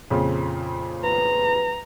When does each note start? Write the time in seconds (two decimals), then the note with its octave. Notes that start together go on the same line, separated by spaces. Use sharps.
0.10 F2 A#2 C#3
1.04 B4 A#5